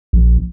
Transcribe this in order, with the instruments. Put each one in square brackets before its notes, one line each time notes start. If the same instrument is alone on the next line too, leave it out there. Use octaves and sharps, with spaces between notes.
[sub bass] A#1